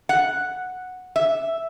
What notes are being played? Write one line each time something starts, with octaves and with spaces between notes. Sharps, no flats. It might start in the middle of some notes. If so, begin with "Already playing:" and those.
F#5
E5